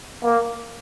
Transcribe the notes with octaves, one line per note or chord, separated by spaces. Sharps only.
A#3